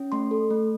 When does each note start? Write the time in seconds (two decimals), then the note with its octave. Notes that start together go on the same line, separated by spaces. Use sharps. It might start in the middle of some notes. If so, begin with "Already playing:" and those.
Already playing: C#4
0.12 A3 C6
0.31 A4
0.50 A3